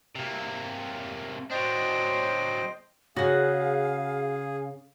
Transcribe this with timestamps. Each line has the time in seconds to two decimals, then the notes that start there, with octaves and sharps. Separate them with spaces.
0.15 C3 A#3
1.51 F#3 D4 C5 D#5 G5
3.16 C#3 F#4 G#4 F5 F#5